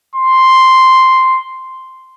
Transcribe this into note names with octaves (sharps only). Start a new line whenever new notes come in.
C6